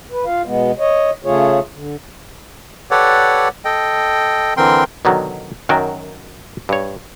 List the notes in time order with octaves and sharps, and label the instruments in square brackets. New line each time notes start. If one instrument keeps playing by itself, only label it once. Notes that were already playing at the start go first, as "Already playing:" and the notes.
[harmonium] B4
F4 F5
B2 G#3 B3
C#5 D#5
C#3 A3 F4 G#4 C#5
D3
[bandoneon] G4 A4 B4 C#5 D5 F#5
A4 D#5 G5
D3 E3 C4 A#4 G5 C6
[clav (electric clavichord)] B2 D3 D#3 F#3
F#2 D#3 F#3 F#4 G5
G2 C#5